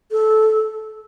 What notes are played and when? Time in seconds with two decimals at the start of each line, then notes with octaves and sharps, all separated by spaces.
0.11 A4